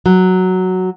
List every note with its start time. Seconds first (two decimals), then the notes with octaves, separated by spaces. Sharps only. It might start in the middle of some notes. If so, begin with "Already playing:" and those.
0.06 F#3